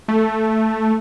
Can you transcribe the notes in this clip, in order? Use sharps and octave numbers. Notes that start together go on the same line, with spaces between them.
A3